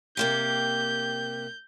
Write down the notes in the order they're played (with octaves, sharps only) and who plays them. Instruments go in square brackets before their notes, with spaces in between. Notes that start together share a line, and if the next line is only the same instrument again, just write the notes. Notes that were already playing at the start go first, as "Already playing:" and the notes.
[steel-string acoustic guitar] C3 A#3 G4 [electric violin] G6